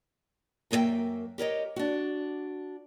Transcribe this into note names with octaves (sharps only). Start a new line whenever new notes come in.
F#2 A#3 E4 A#4 E5 G5
G4 A#4 C#5 D#5
D4 F#4